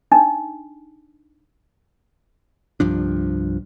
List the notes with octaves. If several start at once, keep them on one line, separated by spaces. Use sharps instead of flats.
D4 D#4
C2 G2 F3 D4